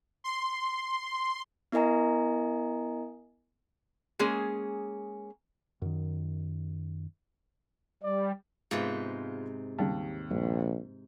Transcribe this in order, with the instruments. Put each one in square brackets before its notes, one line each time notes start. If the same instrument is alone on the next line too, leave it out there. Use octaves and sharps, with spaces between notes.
[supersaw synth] C6
[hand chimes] B3 E4 A#4 D#5 G#5 A#5
[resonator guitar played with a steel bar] G#3 A#3 C#4 G#4
[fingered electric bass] F#2 D#3
[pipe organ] G3 [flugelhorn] D5
[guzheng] G#2 C3 B4 [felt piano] G#3 B3 F4
[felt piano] D#2 [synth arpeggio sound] C#3 G3 A5
[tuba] A#1 [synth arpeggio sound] G2